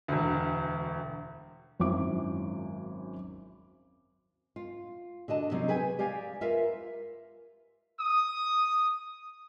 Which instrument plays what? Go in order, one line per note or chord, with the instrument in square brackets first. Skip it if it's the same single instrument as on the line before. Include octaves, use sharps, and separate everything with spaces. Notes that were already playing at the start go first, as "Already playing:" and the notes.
[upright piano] E1 D2
[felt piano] G#1 F#2 C4 E4 D6
[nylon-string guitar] F4
D3 F#4 D#5 A5
C3 F#3 C4 D#4
G#4 B4 G5 G#5
G4 D5 F5 G#5
F4 A#4 B4 E5 F5
[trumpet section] D#6